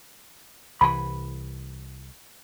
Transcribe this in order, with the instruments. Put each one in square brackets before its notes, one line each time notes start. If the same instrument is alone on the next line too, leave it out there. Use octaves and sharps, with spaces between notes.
[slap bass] C2 E3 [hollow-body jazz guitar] B5